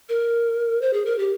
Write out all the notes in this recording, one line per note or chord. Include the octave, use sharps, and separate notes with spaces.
A#4
C5
G#4
A#4
G4